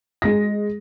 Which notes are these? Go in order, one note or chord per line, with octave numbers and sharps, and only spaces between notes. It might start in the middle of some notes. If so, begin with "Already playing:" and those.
G#3 A#6